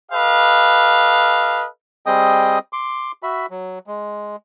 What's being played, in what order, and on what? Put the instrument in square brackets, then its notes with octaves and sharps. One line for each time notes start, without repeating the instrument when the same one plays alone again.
[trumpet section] G4 A4 B4 D#5 F5
[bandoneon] G3 C4 G#4 D#5 G5 D#6
C6 D6
F#4 E5 B5
F#3
G#3